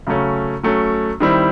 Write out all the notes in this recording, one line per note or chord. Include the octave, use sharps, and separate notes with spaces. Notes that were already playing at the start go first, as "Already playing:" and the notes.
C#3 F#3 A3 C#4
F#3 A3 C#4
D#3 G3 C4 E4